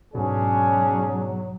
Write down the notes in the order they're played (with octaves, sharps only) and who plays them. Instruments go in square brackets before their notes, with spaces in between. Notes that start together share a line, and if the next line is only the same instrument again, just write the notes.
[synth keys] G#2 B2 [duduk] F#3 [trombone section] C#4 D4 G#4